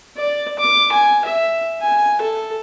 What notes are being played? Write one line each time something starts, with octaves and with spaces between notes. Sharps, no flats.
D5
D6
G#5
E5
G#5
A4